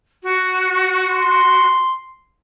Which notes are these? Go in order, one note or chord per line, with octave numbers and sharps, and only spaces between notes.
F#4
C6